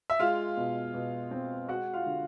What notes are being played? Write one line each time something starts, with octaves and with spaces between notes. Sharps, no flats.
E5
G#3 F4 F5
B2
B2
C4
G#3 F#4 F#5
F4 F5
D3